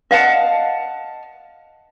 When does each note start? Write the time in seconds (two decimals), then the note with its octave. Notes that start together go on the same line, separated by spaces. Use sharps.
0.11 D#5 F5 F#5 A5